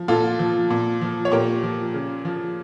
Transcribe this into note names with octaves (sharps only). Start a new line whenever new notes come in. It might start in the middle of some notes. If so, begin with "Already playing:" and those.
Already playing: F3
A#2 F4 A4
F3
A#2
F3
C#5
A#2 G4 A#4
F3
C#3
F3